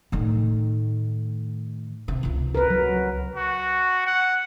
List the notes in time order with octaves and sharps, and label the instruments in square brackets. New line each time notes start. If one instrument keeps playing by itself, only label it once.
[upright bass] A2 D#3
C3
C#2 C4
[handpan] A#4 B4
F#3
[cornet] F#4
F#5